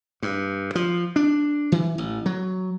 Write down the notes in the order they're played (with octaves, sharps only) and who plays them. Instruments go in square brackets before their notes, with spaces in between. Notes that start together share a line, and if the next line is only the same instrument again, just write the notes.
[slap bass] G2
F3
D4
E3
A1
F#3